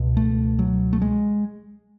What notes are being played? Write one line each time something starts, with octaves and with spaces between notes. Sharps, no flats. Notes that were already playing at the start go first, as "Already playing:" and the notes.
Already playing: C#2 B2
A3
F#3
A3
G#3